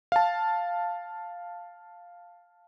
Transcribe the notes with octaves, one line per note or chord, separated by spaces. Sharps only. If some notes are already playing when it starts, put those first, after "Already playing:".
F5 A5